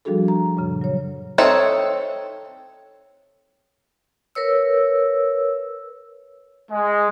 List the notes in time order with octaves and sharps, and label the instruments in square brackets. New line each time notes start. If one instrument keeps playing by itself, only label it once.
[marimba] F3 G3 D4 F#4 G#4 A4
A#5
F#2 A#2 C#3
F#3 C#5
[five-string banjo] C4 D#4 A4 C#5 E5
[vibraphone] A#4 B4 C#5 E6
[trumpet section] G#3